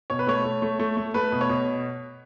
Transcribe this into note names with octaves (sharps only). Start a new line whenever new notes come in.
B2 C#5
B4
A3 C#5
A3
A3
A3
A3
A3 B4
B2
C#5
B2